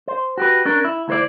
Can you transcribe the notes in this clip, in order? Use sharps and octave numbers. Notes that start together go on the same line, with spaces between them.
C5
F#4 G4 B4
C#4 D4 A#4
E4
D2 E4 A#4 C5 D5